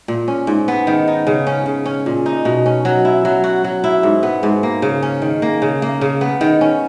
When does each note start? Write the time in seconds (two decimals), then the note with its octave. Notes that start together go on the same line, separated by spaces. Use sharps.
0.08 A#2
0.28 C#4
0.47 G#2
0.68 B3
0.87 D#3
1.08 D#4
1.27 C#3
1.47 C#4
1.66 C#3
1.86 C#4
2.06 A#2
2.26 D#4
2.45 B2
2.66 C#4
2.85 F#3
3.05 E4
3.25 F#3
3.44 F#4
3.64 F#3
3.84 E4
4.03 G#2
4.23 B3
4.43 G#2
4.63 A#3
4.82 C#3
5.03 C#4
5.22 D#3
5.42 A#3
5.62 C#3
5.82 A#3
6.01 C#3
6.21 B3
6.41 D#3
6.61 C#4